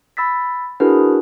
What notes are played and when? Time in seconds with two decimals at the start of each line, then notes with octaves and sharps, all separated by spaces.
0.17 B5 E6 A6 B6
0.80 D4 E4 F#4 G#4 A#4 B4